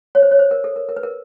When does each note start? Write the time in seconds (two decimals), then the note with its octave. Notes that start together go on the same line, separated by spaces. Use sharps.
0.15 C#5
0.22 C5
0.31 C#5
0.39 C5
0.51 A#4
0.64 A4
0.76 A#4
0.89 A#4
0.97 B4
1.03 A#4